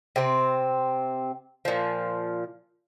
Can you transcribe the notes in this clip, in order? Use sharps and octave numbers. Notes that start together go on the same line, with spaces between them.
C3 C4
A#2 F3